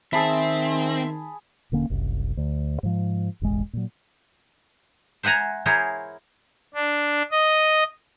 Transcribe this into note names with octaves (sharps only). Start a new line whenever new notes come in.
D#3 C4 G#4 E5 A5 B5
D#1 D3 A#3 C#4
F#1 C2
D2
G#2 F3
E1 A1 G#3
A#2 F#3
C5 E5 F#5 G#5 A#5
E4 G#4 A#4 C5 C#5
D4
D#5